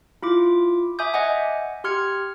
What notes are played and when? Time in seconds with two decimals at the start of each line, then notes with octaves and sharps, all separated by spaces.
0.23 E4 F4 D6
0.99 E5 G#5 D6 D#6 G6
1.14 D#5 E5 F#5 G#5
1.84 G4 C6 F6 G#6 C#7